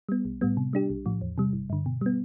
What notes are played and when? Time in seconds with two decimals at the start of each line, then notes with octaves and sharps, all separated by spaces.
0.09 G3 B3
0.25 B1
0.41 A2 G3 B3
0.57 C3
0.73 G3 D4 G4
0.90 B1
1.06 A2 F3
1.21 E2
1.38 C3 G3
1.53 G1
1.70 G2 D3
1.86 B2
2.01 G3 B3